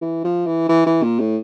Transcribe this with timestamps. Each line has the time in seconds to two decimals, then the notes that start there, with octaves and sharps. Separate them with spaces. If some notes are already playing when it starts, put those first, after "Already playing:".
0.02 E3
0.24 F3
0.46 E3
0.69 E3
0.87 E3
1.03 A#2
1.20 A2